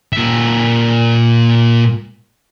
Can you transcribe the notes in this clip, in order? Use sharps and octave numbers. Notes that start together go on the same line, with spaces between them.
A#2 E5